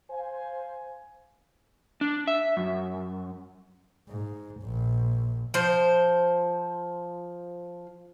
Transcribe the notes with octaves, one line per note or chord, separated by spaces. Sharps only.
C5 F5 G#5
D4
E5
F#2
G#2
A#1
F3 C5